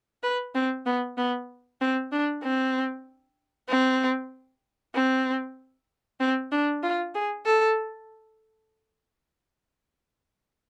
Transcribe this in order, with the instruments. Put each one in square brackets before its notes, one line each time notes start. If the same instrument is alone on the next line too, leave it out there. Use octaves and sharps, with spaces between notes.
[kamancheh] B4
C4
B3
B3
C4
D4
C4
C4
C4
C4
D4
F4
G#4
A4